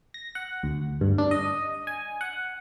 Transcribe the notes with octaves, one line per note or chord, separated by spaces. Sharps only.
A#6
F#5
D2
G2
D4
D#5
G#5
F#5